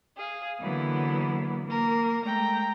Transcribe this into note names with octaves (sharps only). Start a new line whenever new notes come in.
G#4 F5
D3 E3 F#3 A#3 B3 E4
A#3 A#4
G#3 A3 G5 A#5